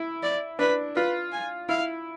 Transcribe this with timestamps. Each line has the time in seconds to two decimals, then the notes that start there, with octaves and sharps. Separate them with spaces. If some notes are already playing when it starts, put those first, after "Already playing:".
Already playing: E4
0.23 D5
0.59 D4 B4
0.96 F4 B4
1.32 G#5
1.69 E4 F5